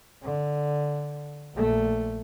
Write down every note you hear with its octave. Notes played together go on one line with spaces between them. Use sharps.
D3
A#1 A3